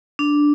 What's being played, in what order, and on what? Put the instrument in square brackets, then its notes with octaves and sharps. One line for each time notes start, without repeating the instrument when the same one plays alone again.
[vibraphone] D4